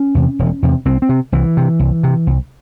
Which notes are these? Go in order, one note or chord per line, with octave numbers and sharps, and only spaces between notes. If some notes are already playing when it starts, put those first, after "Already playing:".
Already playing: C#4
E2 C3
E1
E2 C3
C2 C4
C4
C3
C2 E3
C3
C2
C3
C2